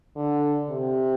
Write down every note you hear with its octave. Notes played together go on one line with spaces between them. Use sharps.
D3
C3